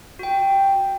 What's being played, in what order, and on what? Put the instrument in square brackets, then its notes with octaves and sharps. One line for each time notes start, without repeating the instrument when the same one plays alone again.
[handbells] F#4 G5